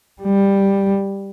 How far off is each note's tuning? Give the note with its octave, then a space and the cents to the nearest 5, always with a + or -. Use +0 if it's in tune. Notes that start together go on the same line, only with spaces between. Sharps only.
G3 +10